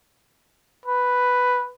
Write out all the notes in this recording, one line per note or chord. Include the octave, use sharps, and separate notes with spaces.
B4